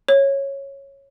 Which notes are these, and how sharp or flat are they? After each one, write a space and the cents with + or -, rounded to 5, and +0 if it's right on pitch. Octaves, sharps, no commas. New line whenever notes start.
C#5 -10